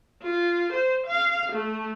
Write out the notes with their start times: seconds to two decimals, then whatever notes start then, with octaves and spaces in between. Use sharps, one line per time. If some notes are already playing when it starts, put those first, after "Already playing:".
0.23 F4
0.73 C5
1.07 F5
1.52 A3